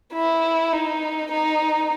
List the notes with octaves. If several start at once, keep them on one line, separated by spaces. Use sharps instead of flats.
E4
D#4
D#4